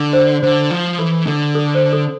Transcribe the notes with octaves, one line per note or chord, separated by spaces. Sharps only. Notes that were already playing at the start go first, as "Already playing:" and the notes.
Already playing: D3
C5
D3 C5
F3
E3 A4
D3 A4
A4
C5
A4